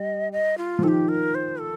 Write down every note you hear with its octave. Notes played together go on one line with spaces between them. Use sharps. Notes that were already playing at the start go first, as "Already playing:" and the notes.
Already playing: G3 D#5
D#5
F4
F3
D#3 G4 A4
A#4
C5
A4